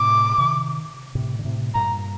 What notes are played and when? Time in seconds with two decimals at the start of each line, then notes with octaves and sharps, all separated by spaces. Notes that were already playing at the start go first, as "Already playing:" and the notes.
Already playing: A2 C3 D6
0.38 C3 D#3
1.15 A2 C3
1.39 D3
1.44 A2 C3
1.74 G2 A#2 A#5